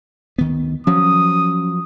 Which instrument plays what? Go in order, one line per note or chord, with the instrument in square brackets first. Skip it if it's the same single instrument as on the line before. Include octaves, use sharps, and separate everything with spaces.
[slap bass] D2 D#3 B3
[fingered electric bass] F3 F#3 [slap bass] C#4 [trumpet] D#6